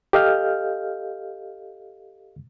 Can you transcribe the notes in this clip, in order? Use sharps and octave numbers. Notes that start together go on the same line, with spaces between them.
G4 A4 D#5 F5 F6 G6